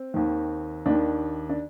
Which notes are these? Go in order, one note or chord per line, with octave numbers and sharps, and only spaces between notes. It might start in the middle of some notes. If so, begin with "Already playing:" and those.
Already playing: C4
D#2 D#3
D#2 D#3 D4
D4